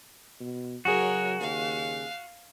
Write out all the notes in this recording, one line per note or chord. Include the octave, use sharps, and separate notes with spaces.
B2
C#3 F#3 F#4 G#4 A#4 C#5
D#2 F5